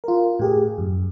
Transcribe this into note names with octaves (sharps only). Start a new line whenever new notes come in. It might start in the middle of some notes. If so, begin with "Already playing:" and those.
F4 A#4
A2 G4 G#4
F#2